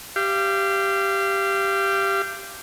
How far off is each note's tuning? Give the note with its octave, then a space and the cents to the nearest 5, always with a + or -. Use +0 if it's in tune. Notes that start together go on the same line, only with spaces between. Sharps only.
G4 +0 F5 -30